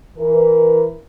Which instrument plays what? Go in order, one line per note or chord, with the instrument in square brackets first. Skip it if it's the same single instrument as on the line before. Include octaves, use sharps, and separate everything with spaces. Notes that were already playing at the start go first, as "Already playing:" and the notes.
[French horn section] E3 A#4